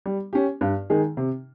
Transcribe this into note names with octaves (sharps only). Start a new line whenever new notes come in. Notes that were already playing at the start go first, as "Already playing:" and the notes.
G3
C#4 G4
G2
D#3 G#3 D#4 G#4
C3